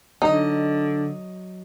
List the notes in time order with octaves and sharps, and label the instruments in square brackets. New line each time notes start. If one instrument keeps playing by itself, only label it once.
[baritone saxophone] D3 [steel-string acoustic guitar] F#3 D#5 [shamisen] D#4